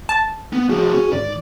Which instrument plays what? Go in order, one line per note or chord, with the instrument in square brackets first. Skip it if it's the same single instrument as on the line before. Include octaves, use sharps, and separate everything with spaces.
[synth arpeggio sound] A5
[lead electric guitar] B3
[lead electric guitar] A2 F3 [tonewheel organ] F#4 G#4
[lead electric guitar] C#4
[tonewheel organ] G#2 D#3 [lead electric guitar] D5